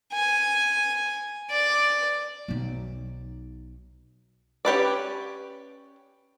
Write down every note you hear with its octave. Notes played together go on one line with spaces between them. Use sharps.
G#5
D5
B1 D#4
C#4 G4 B4 D5